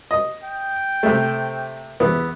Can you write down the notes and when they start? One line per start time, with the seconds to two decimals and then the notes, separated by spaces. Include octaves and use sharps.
0.11 D#5
0.43 G5
1.03 C3 A3
2.00 E2 B3 E5